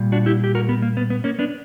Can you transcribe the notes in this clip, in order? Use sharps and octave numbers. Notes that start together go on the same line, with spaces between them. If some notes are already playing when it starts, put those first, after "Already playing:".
Already playing: A#2 G3
D4 F#4
E4 G4
G4
F#4 A#4
B3
A#3
B3
B3
A#3 C#4
B3 D4